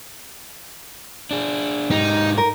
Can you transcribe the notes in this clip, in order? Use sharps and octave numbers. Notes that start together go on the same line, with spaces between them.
D4 G#4
G#2 D#4 G4
A#4